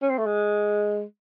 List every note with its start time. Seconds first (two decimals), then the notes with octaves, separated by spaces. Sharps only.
0.02 C#4
0.10 C4
0.18 A3
0.26 G#3